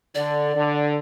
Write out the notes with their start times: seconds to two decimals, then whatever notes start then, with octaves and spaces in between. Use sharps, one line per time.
0.15 D3 D5
0.55 D3